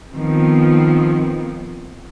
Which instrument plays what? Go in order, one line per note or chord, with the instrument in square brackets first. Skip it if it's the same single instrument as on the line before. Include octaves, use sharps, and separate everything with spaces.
[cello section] D#3 F3 B3 C4